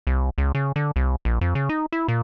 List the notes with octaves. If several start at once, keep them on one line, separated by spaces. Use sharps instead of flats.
C2
C#2
C#3
D3
C2
A#1
F2
C#3
D#4
E4
A#2